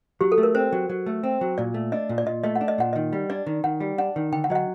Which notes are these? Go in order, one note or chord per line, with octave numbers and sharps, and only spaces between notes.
F#3 G4
A4
A3
A#4
C4 C5
F#3
F#3
A3
C4
F#3
A#2 D5
A3
D4 D#5
A#2
D5
A#2 D#5
A3 D#5
F#5
D4
D#5
A#2 F#5
D#3 D#5
G3
D4 D5
D#3
D#3 F#5
G3
D4 F#5
D#3
D3 G5
F#5
F#3 D#5
F#5